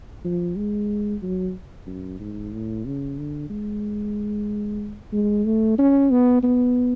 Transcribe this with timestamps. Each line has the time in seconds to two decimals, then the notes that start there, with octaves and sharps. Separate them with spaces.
0.24 F3
0.57 G#3
1.22 F#3
1.87 F#2
2.20 G#2
2.53 A2
2.85 C#3
3.18 D3
3.50 G#3
5.12 G#3
5.45 A3
5.78 C#4
6.11 B3
6.43 B3